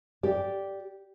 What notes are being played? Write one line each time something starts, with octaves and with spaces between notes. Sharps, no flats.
G4 D5